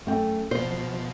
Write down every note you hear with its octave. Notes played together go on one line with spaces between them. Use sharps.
F#2 A3 G5
B2 F3 C5 C7